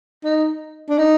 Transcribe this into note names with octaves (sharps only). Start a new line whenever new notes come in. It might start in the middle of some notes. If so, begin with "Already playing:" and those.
D#4
D4
D#4